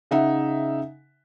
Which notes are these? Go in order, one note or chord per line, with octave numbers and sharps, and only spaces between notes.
C#3 D#4 E5 F#5